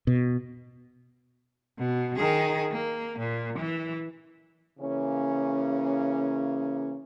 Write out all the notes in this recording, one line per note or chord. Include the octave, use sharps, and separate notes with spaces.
B2
B2
D#3 G#4
A#3
A#2
E3
C#3 E3 A#3 C#4